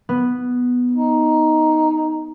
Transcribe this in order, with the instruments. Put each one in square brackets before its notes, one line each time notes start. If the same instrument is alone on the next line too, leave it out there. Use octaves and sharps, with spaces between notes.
[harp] B3
[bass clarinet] D#4